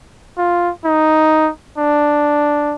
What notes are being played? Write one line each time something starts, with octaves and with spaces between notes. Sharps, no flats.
F4
D#4
D4